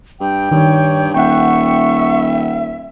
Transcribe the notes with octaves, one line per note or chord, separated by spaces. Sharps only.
G2 G5
G2 D#3 C#5
D#1 E5 F#5 G5 C#6